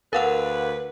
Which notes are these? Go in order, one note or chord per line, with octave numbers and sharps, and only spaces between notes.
D2 A#4 B4 F5 F#5